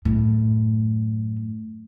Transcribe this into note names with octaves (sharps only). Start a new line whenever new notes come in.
F#2 A2